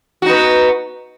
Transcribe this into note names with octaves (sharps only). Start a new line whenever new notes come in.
B3 D#4 F#4